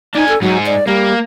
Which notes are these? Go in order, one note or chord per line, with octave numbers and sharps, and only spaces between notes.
D4 D#4 G#5
A4
G#2 F#3 D#4
D5
G3 A#3